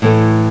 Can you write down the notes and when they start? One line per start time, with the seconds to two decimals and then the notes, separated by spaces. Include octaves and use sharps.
0.02 A2 E3 A3